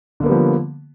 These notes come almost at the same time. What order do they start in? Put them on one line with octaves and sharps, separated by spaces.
D3 A#3 B3 G3 F3